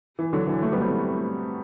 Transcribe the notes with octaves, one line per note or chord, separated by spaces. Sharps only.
E3
D3 F#3
E3
F#3 A3
G3 B3
A3 C4